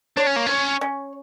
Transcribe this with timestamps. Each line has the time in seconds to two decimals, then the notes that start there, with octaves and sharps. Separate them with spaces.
0.17 D4 C#5
0.27 C#4
0.36 A#3
0.46 C#4 C#5
0.81 C#4